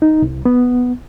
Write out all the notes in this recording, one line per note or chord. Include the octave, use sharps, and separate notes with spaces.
D#4
C2
B3